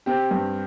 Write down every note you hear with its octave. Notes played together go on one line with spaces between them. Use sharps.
C4 G4
G2